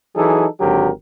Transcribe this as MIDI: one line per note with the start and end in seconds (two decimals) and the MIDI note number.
0.16 0.47 52
0.16 0.47 54
0.16 0.47 63
0.16 0.47 68
0.16 0.47 69
0.61 0.89 32
0.61 0.89 50
0.61 0.89 54
0.61 0.89 67
0.61 0.89 70